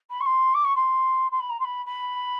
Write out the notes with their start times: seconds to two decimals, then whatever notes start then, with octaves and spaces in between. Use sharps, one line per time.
0.10 B5
0.20 C#6
0.25 C6
0.54 D6
0.64 C#6
0.75 C6
1.31 C6
1.39 B5
1.49 A#5
1.59 C6
1.64 B5
1.86 B5